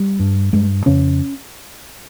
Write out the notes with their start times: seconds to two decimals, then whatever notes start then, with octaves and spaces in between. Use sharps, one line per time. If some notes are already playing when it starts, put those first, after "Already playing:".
Already playing: G3
0.20 G2
0.53 G2 G#3
0.86 F2 C#3 C#4